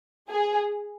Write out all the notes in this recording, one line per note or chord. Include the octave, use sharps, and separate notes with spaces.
G#4